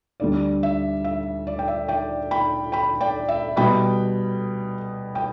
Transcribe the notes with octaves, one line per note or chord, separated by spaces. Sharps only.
D2 D3 G3 D5
E5
E5
D5
G5
E5
D5 G5
G5 B5
G5 B5
D5 G5
E5
B2 G3 B3 G5 B5
G5